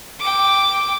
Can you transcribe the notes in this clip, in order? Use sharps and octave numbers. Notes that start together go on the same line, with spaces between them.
G5 D6